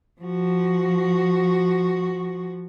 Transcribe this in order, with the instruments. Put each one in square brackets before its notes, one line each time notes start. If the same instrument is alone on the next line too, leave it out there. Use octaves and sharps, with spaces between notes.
[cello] F3 F#4